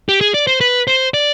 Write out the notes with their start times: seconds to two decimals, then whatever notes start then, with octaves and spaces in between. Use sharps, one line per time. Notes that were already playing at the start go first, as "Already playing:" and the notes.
0.09 G4
0.21 G#4
0.34 D5
0.47 C5
0.61 B4
0.88 C5
1.14 D5